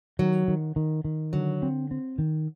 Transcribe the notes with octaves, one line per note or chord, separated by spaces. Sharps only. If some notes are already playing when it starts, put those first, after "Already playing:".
D#3 F#3
D#3
D#3
D#3
D3 F#3
C4
C4
D#3